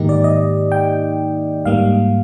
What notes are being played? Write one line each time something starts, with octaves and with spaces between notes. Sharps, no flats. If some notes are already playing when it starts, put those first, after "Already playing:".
Already playing: G#2 D#3 A#3 D#4 G4
D5
D#5
G5
G#2 G3 A#3 F5